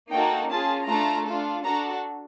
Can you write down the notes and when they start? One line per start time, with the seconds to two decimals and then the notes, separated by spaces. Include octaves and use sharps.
0.12 A#3 D#4 F#4 A4 G5
0.49 C#4 F4 G#4 A5
0.88 A3 D4 F4 A4 A#5
1.26 D4 F4 A4
1.64 D4 F#4 A4 A#5